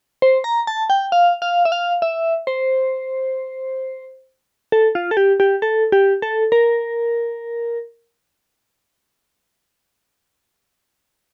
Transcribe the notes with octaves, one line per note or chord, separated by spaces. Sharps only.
C5
A#5
A5
G5
F5
F5
E5
F5
E5
C5
A4
F4
A4
G4
G4
A4
G4
A4
A#4